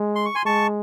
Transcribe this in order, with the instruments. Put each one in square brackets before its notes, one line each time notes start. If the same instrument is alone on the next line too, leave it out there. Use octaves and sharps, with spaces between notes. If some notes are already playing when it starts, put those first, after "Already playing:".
Already playing: [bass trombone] G#3
[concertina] C6
C#6
G#5 C6
[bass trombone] G#3 [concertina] A5 C#6